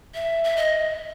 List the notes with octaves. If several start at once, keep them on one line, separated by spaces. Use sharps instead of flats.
E5
E5
D#5